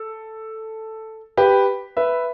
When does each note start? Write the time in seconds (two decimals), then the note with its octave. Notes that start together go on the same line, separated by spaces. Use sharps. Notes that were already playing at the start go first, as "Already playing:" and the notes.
Already playing: A4
1.37 G4 B4
1.97 B4 E5